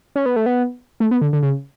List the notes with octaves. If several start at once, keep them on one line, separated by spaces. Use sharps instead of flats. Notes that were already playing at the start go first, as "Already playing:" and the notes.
C#4
B3
A3
B3
A3
B3
D3
D3
C#3